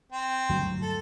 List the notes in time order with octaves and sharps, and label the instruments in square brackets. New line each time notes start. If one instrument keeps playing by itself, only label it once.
[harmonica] C4
[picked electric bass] D2 G2 F#3
[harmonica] A4